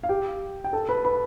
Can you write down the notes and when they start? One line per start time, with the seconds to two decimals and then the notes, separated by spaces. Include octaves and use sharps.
0.03 F5
0.09 G4 G5
0.64 G5
0.73 A4 A5
0.89 B4 B5
1.05 B4 B5